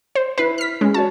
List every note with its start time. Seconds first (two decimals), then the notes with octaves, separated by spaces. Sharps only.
0.15 C5
0.38 E4 B4 C7
0.58 F6 B6
0.81 G#3 C#4
0.94 F#4 C#5 A5